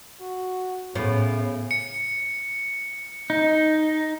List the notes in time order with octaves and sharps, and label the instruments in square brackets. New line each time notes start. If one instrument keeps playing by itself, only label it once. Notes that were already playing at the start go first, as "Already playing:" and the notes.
[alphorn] F#4
[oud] A2 B3 [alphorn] C#3
[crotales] C#7
[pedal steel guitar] D#4